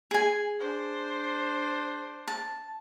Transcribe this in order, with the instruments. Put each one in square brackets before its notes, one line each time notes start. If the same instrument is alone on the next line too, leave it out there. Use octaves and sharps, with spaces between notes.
[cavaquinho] G#4 G#5
[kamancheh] D4 C5
[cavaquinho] A5